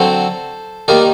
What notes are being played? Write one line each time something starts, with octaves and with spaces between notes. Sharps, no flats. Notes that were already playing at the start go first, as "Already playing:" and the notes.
Already playing: D3 F#3 C4 A4 C5
D#3 G3 A#3 D#4 A#4 D5